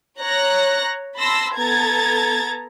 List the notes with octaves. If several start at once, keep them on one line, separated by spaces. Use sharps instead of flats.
C#5 A#5 F#6 A#6
A5 B5 C6 E6 A#6
B3 A4 A#5 G#6 A6